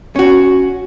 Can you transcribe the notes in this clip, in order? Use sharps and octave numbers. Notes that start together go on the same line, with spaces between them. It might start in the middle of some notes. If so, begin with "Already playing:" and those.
C#4 F#4